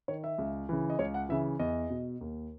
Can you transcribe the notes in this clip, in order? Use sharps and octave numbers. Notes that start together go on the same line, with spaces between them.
D#3 C#5
E5
C#2
C#3 E3
D#5
C#2 C#5
F#5
C#3 E3 E5
E2 D#5
B2
D#2